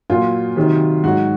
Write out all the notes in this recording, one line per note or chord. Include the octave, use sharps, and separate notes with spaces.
A#2 F#3 F4
C3 D#3 F#3
G#2 F#3 F#4